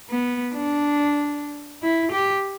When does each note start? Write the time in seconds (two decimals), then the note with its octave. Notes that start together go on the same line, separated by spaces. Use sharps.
0.10 B3
0.54 D4
1.83 E4
2.12 G4